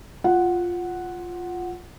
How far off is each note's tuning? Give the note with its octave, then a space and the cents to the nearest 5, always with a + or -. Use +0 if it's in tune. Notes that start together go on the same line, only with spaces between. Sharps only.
F4 +5 F#5 +0